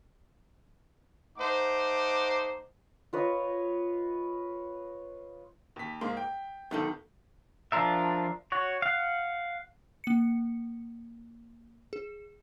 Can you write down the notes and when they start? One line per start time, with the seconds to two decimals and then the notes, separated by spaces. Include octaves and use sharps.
1.38 A3 D#4 C5 F#5 D6
3.13 F4 B4 C#5 D#5
5.76 D#2 B6
6.01 G#2 G#3 A#3 C6
6.17 G5
6.71 B1 D#3 B3 D#4 A4
7.72 F3 D4 F4 A#4 E5
8.52 F#4 C#5
8.82 F5 F#5
10.04 A#3 C#7
11.93 G#4